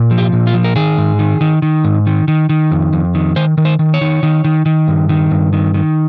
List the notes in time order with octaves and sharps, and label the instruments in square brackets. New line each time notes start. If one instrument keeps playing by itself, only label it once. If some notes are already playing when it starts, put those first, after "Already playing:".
Already playing: [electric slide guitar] A#2
F3
G4
A#2
F4
F3
A#4
D#3 G#4
G#2
D#3
D#3
D#3
G#2
D#3
D#3
D#3
F2
F2
D#3
D#3 C5
D#3
C5
D#3
C#5
D#3
D#3
D#3
D#3
G2
D#3
G2
D#3
D#3